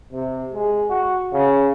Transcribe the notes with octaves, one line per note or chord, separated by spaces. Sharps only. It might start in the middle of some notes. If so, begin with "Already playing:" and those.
C3
G#3
F#4
C#3